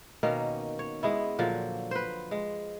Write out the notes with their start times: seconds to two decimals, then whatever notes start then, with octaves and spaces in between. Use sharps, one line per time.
0.23 B2 D#3 A#3 C#4
0.79 C#5
1.03 G#3 B3 E4
1.39 A#2 D3 F3 F#3
1.91 B4 C5
2.31 G#3